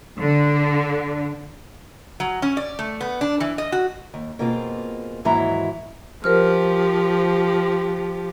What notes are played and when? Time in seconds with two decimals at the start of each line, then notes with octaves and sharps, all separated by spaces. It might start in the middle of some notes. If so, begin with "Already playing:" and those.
0.21 D3
2.20 F#3
2.42 C#4
2.57 D5
2.79 A3
3.01 B3
3.21 D4
3.40 E3
3.58 D#5
3.72 F#4
4.14 D#2
4.39 B2 A#3 C4 F4 G#4
5.25 D#2 G#2 E3 F#3 E4 A#5
6.24 F3 G4 A#4 C5 F6